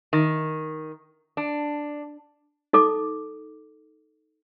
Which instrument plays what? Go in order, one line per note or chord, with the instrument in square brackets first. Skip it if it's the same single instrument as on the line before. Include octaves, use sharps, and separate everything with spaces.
[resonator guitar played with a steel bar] D#3
D4
[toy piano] D#4 A4 D6